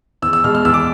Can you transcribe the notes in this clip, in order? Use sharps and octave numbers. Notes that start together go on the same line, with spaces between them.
E2 E6
E6
B2 G#3 F6
F6
E2 E6
D6